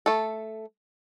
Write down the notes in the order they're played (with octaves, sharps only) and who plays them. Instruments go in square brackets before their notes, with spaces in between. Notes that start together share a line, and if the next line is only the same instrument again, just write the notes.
[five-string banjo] A3 A4